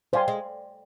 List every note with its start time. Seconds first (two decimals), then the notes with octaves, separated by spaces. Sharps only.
0.13 G3 C5 F5 G#5 C6
0.28 G#3